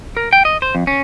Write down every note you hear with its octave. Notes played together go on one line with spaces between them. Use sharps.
A#4
G5
D#5
C5
F2
C#4